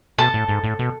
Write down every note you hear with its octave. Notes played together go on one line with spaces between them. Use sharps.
B2 A4 A5
A2
G#2
A2
B2